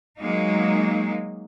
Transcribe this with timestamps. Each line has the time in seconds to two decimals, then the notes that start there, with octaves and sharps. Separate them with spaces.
0.19 F#3 G#3 A#3 D#4